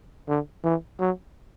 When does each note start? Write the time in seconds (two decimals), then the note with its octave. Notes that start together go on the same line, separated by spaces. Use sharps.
0.28 D3
0.64 E3
1.00 F#3